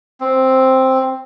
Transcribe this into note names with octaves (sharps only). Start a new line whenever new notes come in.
C4